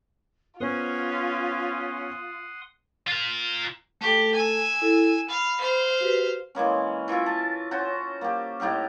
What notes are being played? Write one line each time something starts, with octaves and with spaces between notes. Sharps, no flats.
B3 C#4 F4 C5 F#5 C6 D#6
F4 A#4
A3 G4 A4
G#5 E6
E4 A4
F5 B5
C5 F5
F#4 G4 B4
E3 G#3 A#3 C#4
E3 F4 A#4 E5
A5
C#4 F#4 C5 A#5
A#3 G4
A2 D#4 G4 F5